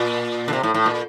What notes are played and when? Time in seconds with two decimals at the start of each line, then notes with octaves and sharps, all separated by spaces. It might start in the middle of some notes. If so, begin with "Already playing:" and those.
Already playing: A#2
0.48 D3
0.53 C3
0.63 A2
0.74 A2
0.86 A#2